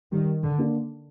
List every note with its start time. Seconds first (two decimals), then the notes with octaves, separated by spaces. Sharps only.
0.12 D#3 G3
0.43 D3
0.58 A#3 D4